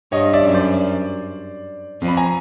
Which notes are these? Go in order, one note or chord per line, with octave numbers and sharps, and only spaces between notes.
G2 C#5 D#5
D5 E5
F#2
C5 D5
F2
B5
G#5 A#5